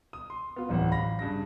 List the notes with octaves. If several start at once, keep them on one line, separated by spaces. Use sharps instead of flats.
D#6
C6
B3 F4
D1 A1 E2 F#5
A1 F5 B5 A#6
G2 C#3 A#6